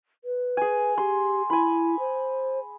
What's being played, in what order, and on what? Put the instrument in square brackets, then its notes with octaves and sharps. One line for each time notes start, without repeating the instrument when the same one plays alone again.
[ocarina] B4
[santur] G#4 G#5
[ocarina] G4 [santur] C6
[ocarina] E4 [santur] G#5 B5
[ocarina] C5